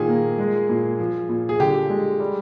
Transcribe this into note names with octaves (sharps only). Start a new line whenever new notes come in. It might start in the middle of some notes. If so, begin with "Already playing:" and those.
Already playing: A#2 D#3 G#4
A#3
G#3
A#2
F3
A#2
G#4
D3 G4
G#3
G3